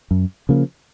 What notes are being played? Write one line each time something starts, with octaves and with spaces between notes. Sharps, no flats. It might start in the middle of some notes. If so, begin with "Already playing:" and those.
F#2
C#3 F3 A#3